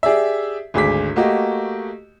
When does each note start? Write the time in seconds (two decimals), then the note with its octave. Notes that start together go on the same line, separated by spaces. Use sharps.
0.03 G4 G#4 D5 E5
0.74 G#1 D2 G#4 D6 B6
1.16 A3 A#3 F#4 G4 D#5